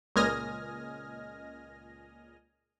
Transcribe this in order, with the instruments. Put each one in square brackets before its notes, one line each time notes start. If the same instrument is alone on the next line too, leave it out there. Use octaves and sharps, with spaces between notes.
[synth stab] C#2 A#2 D#5 G#5 F6 A#6